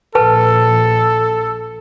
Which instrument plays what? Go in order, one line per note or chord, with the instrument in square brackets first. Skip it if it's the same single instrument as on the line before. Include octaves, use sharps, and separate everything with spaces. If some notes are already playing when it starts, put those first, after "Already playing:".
[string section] A#1 [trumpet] A4 [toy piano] B4 A5